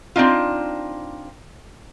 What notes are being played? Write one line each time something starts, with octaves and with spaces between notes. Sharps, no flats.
C4 D4 D#4 F4